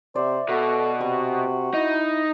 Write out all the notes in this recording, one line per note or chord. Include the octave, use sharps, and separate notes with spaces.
C3 C5 D5 E5
B2 F#4 A4
C3 C#6
D#4 E4